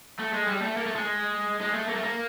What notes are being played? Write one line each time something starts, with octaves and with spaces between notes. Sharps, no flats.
A3
G#3
G3
A3
A#3
A3
G#3
G#3
A3
A#3
A3
A#3